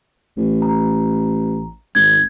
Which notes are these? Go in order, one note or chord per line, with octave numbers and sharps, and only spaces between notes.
A1
A#5
G#1 G#6